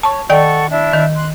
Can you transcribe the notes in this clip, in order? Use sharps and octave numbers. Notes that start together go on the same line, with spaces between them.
C#5 A5 C#6
D#3 A4 D5 F#5 G5 C#6
D4 E4 E5
D#3
C6 F#6